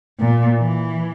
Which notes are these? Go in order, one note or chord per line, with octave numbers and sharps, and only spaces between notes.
A#2
E3